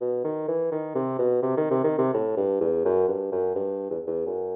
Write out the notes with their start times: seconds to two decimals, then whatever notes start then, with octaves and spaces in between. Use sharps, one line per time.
0.01 B2
0.24 D#3
0.48 E3
0.72 D#3
0.95 C3
1.19 B2
1.42 C3
1.57 D#3
1.70 C3
1.84 D#3
1.98 C3
2.14 A2
2.37 G2
2.61 E2
2.85 F#2
3.08 G2
3.32 F#2
3.55 G2
3.90 E2
4.07 E2
4.26 F#2